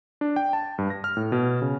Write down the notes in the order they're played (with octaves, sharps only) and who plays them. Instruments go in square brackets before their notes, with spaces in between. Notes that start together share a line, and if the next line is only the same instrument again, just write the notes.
[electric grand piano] D4
G5
A5
G2
A#6
F6
A2
B2
C#3